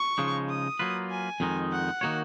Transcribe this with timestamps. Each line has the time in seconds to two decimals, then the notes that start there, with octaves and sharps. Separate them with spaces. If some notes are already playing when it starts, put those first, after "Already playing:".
Already playing: C#6
0.18 C#3 F3 G#3 D#4
0.49 D#6
0.79 F#3 A#3 F4 B4
1.10 G#5
1.40 F2 D#3 G#3 D#4
1.71 F#5
2.01 D#3 A#3 D#4 F#4 C#5